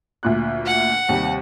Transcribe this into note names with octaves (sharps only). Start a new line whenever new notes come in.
D2 A#2 F#6
F#5
D#2 C3 G3